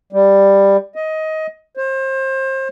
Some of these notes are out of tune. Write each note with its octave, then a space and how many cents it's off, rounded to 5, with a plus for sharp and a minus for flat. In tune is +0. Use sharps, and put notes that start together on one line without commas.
G3 +10
D#5 +20
C5 +30